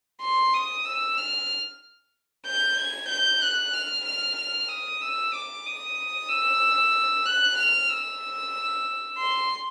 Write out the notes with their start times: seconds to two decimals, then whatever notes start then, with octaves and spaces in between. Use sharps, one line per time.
0.21 C6
0.54 D#6
0.85 E6
1.17 F6
2.46 G6
2.77 G#6
3.09 G6
3.41 F#6
3.74 F6
4.06 F6
4.37 F6
4.69 D#6
5.01 E6
5.33 D6
5.66 D#6
6.29 E6
7.26 F#6
7.58 F6
7.89 E6
9.18 C6